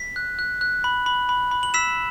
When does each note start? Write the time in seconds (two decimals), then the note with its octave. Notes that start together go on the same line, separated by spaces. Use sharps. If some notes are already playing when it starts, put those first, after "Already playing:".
Already playing: B6
0.16 F#6
0.39 F#6
0.61 F#6
0.84 B5
1.06 B5
1.29 B5
1.51 B5
1.63 F#7
1.74 E6 B6 E7